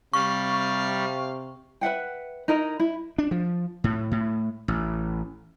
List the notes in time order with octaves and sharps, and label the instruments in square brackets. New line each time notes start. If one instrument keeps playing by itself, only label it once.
[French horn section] C3 [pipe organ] G3 [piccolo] F5 [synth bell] C#6
[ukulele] B4 E5 F#5 G5
D#4 E4 A#4 D#5
E4
[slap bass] D4
F3
A2
A2
A1